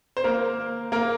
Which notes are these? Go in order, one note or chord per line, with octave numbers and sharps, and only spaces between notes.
C5
A#3 A#4
A#3 A#4